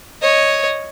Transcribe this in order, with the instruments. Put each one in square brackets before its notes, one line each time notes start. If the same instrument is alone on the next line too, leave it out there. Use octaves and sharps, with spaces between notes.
[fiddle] C#5 D#5